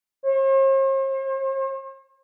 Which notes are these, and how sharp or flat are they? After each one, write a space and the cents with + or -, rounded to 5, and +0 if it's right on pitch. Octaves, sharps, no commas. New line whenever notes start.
C5 +45